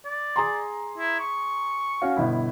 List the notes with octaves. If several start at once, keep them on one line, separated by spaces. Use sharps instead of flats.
D5
G#4 A#5 C6
E4
C#6
C#4 F#4 F5
G1 B2 E4